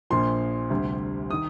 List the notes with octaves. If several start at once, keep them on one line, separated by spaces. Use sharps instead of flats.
A#1 A#2 F3 C6
D2 C3 G3
D#3 D#6